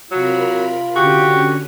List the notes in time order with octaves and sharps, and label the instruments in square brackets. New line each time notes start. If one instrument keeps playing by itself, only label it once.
[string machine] C3 A#4 B5 [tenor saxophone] F#3 [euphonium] F4
[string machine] D3 C#4 [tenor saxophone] F#4 [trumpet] G4